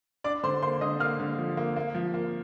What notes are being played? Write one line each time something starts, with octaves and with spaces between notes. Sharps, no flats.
D4 D5 D6
D3 C5 C6
A#3 C5 C6
D3 D#5 D#6
A#3 F5 F6
D3
F3
A#3
A#3
F3
A#3